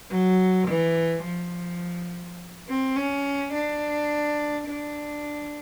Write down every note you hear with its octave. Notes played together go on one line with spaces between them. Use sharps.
F#3
E3
F3
C4
C#4
D4
D4